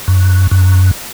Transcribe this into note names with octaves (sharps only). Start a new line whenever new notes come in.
F#2
F#2